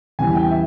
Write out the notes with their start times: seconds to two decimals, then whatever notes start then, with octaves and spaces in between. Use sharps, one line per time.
0.19 E2 C#3 G3 B3 E4 G#5
0.35 G5
0.51 E5